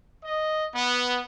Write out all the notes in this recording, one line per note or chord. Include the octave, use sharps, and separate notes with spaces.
D#5
B3